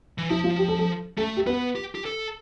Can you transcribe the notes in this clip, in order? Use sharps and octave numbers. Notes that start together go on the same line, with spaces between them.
E3
F3 E4
F4
G4
A4
A4
A3 A4
G4
B3 B4
G4
G4
A4